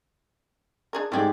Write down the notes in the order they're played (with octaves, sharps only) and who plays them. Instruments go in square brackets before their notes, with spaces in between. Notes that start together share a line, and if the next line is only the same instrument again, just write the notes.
[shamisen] D4 G#4 A#4
[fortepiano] G#2 G#3 [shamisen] A3 G#4 [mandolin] G4 D5 G5